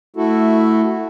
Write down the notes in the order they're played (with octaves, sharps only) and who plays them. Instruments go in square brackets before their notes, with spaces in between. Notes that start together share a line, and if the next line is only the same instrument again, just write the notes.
[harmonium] A3 E4 F#4 A4